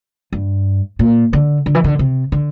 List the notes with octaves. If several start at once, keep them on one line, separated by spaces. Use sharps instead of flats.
G2
A#2
D3
D3
E3
D3
C3
D3